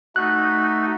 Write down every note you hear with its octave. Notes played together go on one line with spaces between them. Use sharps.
A3 D#4 F#4 F#6